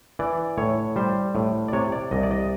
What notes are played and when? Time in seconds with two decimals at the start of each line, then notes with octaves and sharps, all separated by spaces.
0.19 E3 D5
0.58 A2 C#5
0.96 G3 C5
1.35 A2
1.68 D5
1.73 C3 C#5
1.92 D5
2.11 C2 D#5
2.23 D5
2.31 D#5